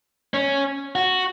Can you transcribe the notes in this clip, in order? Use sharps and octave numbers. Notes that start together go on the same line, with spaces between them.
C#4
F#4